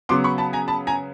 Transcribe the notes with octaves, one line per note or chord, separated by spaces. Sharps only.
C#3 F#3 B3 C6 D6
B5 C#6
A5 B5
G#5 A#5
A5 B5
G#5 A#5